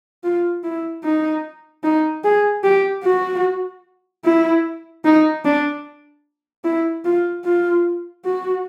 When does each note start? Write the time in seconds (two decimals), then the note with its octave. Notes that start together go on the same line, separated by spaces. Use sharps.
0.24 F4
0.64 E4
1.04 D#4
1.84 D#4
2.24 G#4
2.64 G4
3.04 F#4
4.25 E4
5.05 D#4
5.45 D4
6.64 E4
7.05 F4
7.45 F4
8.25 F#4